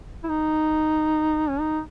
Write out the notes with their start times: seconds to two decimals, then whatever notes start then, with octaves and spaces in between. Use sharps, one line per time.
0.24 E4
0.29 D#4
1.49 C#4
1.60 D#4